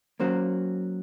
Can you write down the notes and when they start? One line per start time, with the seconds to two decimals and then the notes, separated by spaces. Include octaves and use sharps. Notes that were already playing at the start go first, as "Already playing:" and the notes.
0.20 F#3 A#3 C#4 F#4 C5